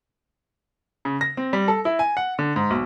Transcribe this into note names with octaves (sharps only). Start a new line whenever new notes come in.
C#3
A#6
C4
G3
A4
E4
G#5
F#5
D3
G#2
B1